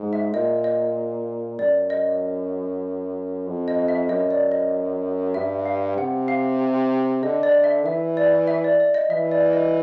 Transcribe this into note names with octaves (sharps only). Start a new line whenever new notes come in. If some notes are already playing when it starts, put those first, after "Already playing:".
Already playing: G#2
E5
A#2 D#5
D#5
F#2 D5
D#5
F2
D#5
E5
F#2 D#5
D5
D#5
G2 E5
F5
C3 F#5
F5
D3 D#5
D5
E5
E3 E5
D5
E5
D5
D5
D#5
E3 E5
D5
D#5